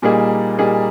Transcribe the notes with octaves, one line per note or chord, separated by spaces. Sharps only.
A#2 G3 A#3 D#4 G#4
A#2 G3 A#3 D#4 G#4